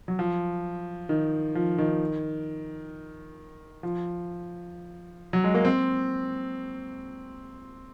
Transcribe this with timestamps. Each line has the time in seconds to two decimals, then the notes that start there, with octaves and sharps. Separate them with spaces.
0.08 F#3
0.19 F3
1.09 D#3
1.55 F3
1.78 D#3
3.83 F3
5.33 F#3
5.44 G#3
5.55 A#3
5.65 C4